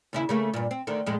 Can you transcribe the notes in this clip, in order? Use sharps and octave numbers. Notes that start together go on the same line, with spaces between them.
D#2 C#3 E4
C#3 A3 A#3
G2 A#2
C4
D2 D3 D#3
F2 A2 G#3